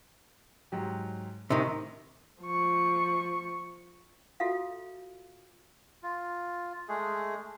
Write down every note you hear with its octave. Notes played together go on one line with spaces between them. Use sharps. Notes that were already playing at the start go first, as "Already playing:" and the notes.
G#2 F#3 G4
A2 C3 D#3
F3 C#6
F4 F#4 A4 E5 F5
F4
G#3 A3 G#4